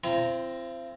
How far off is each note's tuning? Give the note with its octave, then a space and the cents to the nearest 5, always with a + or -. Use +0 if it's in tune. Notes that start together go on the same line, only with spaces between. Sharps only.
C4 +0 F4 -45 A#5 +0